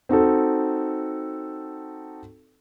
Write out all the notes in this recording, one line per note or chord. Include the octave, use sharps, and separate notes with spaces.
C4 D#4 F#4 A4